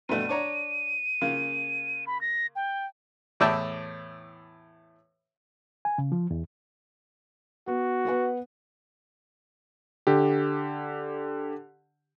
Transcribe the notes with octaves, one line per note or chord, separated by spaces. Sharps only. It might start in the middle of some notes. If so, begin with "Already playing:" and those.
G2 B2 A3 D#7
D4 C#5 A#5
C#3 A#3 F4
B5
A#6
G5
E2 A2 D5 E5 G5 A5
G#5
C#3
F3
E2
B3 F#4
B3 B4 F#5
D3 G4